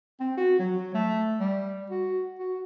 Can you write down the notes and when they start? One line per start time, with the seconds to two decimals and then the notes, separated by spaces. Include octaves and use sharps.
0.20 C4
0.37 F#4
0.59 F#3
0.94 A3
1.39 G3
1.90 F#4
2.39 F#4